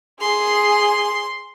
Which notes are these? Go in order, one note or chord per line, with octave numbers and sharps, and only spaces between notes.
G#4 C6